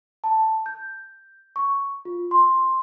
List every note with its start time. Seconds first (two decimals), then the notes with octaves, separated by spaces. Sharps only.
0.24 A5
0.66 G6
1.56 C#6
2.05 F4
2.31 C6